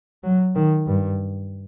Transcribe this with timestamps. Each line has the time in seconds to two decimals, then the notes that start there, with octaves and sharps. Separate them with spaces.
0.24 F#3
0.55 D#3
0.87 G2